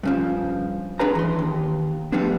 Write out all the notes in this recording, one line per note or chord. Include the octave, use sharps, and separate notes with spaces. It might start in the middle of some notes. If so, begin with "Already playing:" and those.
G2 C#3 F3
D4 G#4 B4 A#5
E3 C6
D#2
F3 G3 A3 B3 C4 D4